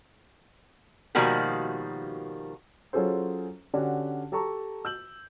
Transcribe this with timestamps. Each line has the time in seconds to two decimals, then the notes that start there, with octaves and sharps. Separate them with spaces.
1.15 B2 D#3 F3 G3 A#3 F#4
2.93 F#3 C#4 F4 G#4 A4 C5
3.74 D3 C#4 D4 F#4 G4
4.32 G4 A4 A5 A#5 C#6
4.85 E6 G6 F#7